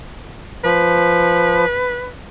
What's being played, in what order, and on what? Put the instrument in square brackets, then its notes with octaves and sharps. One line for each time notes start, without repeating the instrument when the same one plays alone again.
[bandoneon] F3 [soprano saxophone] B4